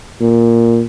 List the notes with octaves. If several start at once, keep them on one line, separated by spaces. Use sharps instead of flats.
A#2